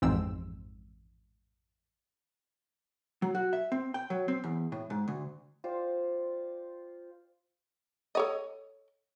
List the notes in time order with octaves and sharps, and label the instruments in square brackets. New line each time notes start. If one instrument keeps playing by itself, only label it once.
[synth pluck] A1 F2 G#2 C4 E6
[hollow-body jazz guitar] F#3
F#4
E5
C4
G5
F#3
C4
E2
A2
G#2
D2
[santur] F4 C5 D5 G5
[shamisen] A4 C#5 D#5